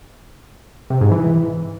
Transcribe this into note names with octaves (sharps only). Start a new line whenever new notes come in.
C3
G#2
E3